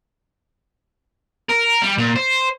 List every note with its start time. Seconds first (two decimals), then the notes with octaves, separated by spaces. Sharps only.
1.49 A#4
1.82 G3
1.98 A#2
2.16 C5